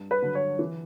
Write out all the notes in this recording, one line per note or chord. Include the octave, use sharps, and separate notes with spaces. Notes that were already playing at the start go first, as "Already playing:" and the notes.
Already playing: G2
B4
D3 F#3
C#5
E3